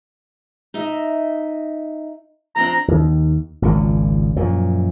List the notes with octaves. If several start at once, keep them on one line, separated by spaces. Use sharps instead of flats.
D#4 D#5 E5
F2 C4 D4 A#5
D#2
G#1 C#2 A#2
F#2 A#2 F3